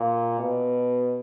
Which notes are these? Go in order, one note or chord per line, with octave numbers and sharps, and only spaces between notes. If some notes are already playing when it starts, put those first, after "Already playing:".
Already playing: A#2
B2